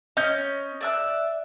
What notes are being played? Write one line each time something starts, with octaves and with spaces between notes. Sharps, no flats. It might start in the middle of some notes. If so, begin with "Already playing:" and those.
C#4 D#5 G6
D5 E5 F#6